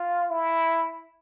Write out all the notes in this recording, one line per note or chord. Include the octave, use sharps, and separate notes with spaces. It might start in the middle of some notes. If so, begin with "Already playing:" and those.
Already playing: F4
E4